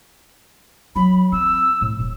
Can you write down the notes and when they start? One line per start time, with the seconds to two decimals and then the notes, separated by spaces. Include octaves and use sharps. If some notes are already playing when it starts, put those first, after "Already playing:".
0.96 F#3 B5
1.32 C4 E6
1.81 A2
2.00 D#1